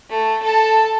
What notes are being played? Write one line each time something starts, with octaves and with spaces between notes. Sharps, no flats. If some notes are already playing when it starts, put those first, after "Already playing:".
A3
A4 A5